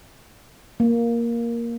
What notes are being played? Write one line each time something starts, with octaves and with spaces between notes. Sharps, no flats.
A#3